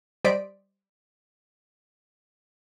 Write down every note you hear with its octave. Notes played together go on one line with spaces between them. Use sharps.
G3 C5 D5 D#5 B6 D7